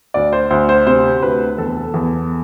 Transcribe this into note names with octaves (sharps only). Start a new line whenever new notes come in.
D2 D5
C5
D2 C5
C5
C3 C5
D2 B4
E2 A4
E2